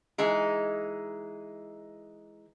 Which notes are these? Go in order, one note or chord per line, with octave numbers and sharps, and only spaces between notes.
E3 G#3 D#4